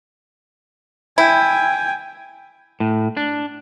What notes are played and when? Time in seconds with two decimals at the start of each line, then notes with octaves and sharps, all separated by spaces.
1.18 E4 G5 G#5
2.80 A2
3.17 D4